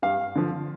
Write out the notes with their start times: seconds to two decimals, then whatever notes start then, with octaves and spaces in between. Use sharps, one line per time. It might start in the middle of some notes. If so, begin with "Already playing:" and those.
0.02 G2 F5
0.36 D3 F3